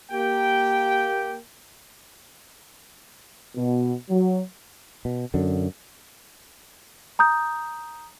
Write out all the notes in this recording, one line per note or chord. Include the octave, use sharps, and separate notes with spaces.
A#3 G4 G5
B2
F#3
B2
F#2 D3
A#5 D#6 G6